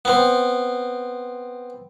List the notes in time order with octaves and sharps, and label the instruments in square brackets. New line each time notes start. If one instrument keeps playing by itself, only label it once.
[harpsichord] B3 C4